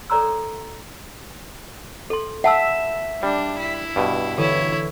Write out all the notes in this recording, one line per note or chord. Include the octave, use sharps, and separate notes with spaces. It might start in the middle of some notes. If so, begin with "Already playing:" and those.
A4 C#5 D5 A#5 C6 E6
A4 C6
E5 F#5 A5 E6
G3 D4
E4
G2 B2
D3 E3 E4 A4 C#5